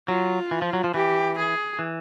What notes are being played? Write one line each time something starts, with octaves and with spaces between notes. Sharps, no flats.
F#3 F4
E3
F3
F#3
F3
E3 G4
G#4
E3